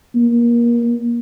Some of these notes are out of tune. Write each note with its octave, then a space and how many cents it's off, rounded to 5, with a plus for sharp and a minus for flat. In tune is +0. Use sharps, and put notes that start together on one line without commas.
A#3 +25